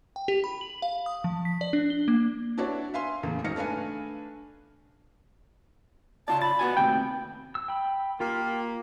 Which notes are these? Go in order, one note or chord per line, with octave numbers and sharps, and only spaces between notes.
G5
G4
B5
F#7
F5
D#6
F3
B6
D5
D4
G7
A#3
B3 D4 E4 F#4 C#5 D5
E5 F5 G#5 C6
E2 A2 C#3 A#3
G#1 D#4 F6 A#6 C#7
A3 D4 B4 F5 G#5
C#3 F4 D5 A5
B5 A6
B3 F#4 G#5
D#2 A2 C3 G5
E6
G5 B5
A#3 F4 G4